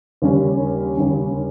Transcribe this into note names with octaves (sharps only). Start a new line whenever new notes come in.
D#2 C#3 G3 C#4
D#2 C#3 G3 C#4